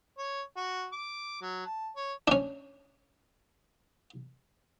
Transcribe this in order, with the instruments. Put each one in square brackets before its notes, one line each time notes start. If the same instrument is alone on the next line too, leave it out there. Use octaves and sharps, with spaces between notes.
[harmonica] C#5
F#4
D6
F#3
A5
C#5
[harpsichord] C#4 D4